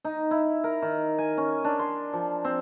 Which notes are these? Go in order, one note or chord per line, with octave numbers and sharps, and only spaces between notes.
D#4
E4
A#4
D#3
G#5
C#4
D4
C6
F3
C4